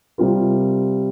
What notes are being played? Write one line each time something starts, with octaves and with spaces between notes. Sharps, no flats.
C3 G3 C4 F4 A#4